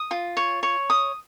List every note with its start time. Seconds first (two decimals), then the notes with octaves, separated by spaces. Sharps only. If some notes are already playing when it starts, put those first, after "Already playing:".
Already playing: D#6
0.11 F4
0.37 C#5
0.63 C#5
0.90 D#6